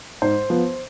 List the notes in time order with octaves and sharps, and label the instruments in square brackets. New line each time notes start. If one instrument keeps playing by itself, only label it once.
[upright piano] G#2 C5
F3 B3